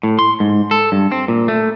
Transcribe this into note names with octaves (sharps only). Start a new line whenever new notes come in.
A2
C6
G#2
A4
G2
C4
A#2
A3